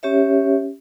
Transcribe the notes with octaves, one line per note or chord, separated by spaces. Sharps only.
C#4 G4 C#5 E5